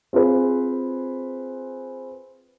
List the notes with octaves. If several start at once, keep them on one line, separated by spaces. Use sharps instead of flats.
C4 F4 G#4 B4 C5